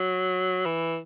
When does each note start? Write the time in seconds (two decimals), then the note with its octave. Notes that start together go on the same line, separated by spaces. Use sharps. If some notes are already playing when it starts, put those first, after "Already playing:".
Already playing: F#3
0.66 E3